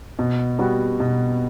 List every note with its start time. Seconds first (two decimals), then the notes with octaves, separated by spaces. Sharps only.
0.19 B2
0.58 G3 B3 F#4
1.00 B2